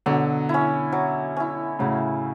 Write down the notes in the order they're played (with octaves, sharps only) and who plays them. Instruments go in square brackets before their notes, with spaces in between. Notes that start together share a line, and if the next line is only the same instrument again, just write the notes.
[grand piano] B2 D3 [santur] F#3
[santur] C#4 E4
F#3
C#4 E4
[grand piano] A2 C#3 [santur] F#3